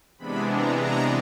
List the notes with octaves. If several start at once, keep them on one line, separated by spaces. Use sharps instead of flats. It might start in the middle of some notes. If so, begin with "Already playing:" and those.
C3 E3 G#3 B3 D4 B5
A#5
A#5